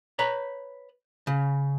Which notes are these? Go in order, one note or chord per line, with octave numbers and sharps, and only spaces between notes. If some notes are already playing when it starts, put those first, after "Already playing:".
B4 C#5 A#5
C#3